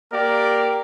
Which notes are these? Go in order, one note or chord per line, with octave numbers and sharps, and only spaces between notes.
A#3 G4 A#4 D5